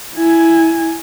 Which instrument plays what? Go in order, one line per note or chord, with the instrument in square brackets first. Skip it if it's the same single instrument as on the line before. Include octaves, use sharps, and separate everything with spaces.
[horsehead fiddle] E4 G#5